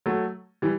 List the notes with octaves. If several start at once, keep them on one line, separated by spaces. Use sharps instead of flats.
F#3 A3
E3 G3